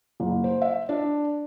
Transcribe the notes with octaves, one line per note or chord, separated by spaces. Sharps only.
F#1
C5
E5
D4